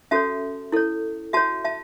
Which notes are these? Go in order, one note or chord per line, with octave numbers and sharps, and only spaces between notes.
C#4 F#4 A4 C#5 E5 A5
E4 A4 C#5
F#4 C#5 E5 A5
E5 A5